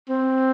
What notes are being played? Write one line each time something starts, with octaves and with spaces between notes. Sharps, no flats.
C4